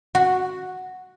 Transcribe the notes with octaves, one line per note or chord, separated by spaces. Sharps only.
F#4